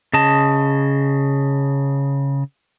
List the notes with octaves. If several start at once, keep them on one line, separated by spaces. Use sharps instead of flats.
C#3 D#5 A5